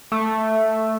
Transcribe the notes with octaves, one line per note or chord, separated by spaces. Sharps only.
A3